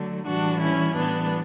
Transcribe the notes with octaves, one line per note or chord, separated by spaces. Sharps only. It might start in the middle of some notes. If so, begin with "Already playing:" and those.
Already playing: D3 F#3 A3
A2 E3 G3 D4 F#4
C#4 E4
A2 E3 G3 B3 D4